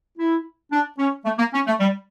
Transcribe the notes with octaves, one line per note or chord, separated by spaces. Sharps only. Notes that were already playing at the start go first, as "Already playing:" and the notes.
E4
D4
C#4
A3
A#3
C#4
A3
G3